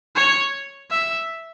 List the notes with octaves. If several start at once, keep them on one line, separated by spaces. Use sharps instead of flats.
C#5
E5